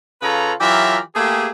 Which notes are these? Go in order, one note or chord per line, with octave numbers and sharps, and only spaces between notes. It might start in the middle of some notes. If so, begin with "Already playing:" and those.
C#3 F4 A4 B4 C#5 A#5
E3 F#3 F4 G4 A#4 E5
A3 A#3 G4 G#4